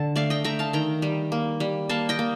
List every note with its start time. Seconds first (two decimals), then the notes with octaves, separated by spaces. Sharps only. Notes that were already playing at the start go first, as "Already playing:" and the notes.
Already playing: D3 A5
0.16 A3 D5 F5
0.30 D#5 G5
0.44 A3 G5 A#5
0.59 F5 A5
0.73 D#3 G5 A#5
1.02 G3
1.32 A#3
1.60 G3
1.89 A#3 F5 A5
2.09 D#5 G5
2.19 A#3